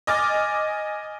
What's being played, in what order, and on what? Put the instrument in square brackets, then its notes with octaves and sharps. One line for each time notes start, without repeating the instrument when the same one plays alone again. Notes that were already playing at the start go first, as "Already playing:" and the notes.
[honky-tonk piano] D#5 G#5 D6 F6 A6